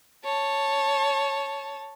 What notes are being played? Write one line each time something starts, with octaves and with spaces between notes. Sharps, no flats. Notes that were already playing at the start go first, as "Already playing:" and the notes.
C#5 A5